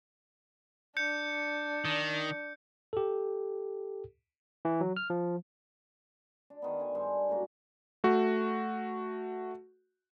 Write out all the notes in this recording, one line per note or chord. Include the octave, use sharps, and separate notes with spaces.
D4 G6 C#7
D#3
G4 A4
E3
F#3
F6
F3
D4
D#3 B3
D3 G#5
G2 D3 C5 G#5
F#2 A2 A#3 F#4
A3 F#4